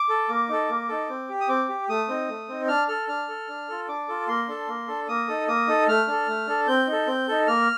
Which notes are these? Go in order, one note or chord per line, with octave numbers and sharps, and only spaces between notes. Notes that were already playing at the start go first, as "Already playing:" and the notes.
Already playing: D6
A4
A#3
D#4 A4
A#3
D#4 A4
C4
G4
D#6
C4 D6
G4
A3 D#6
C4 D#4
A3
C4 D#4
D4 F6
A4 F6
D4 F6
A4
D4
F4 A4
D4 D6
F4 A4
A#3 C6
D4 A4
A#3
D4 A4
A#3 D#6
D#4 A4
A#3 D#6
D#4 A4
A3 F6
D4 A4
A3
D4 A4
C4 G6
D#4 A4
C4
D#4 A4
A#3 F6